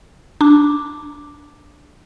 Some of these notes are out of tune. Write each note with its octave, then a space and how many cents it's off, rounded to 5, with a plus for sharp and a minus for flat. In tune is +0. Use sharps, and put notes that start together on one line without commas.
D4 +0 D6 +0